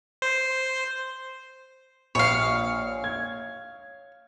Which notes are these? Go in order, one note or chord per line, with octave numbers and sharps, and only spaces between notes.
C5
A#1 C#5 F5
G#6